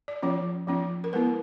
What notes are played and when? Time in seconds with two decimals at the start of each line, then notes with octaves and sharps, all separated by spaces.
0.08 D5
0.22 F3 A#3 C#4 F4 C#5
0.67 F3 A#3 C#4 F4
1.04 A#4
1.13 G#3 B3 E4 B4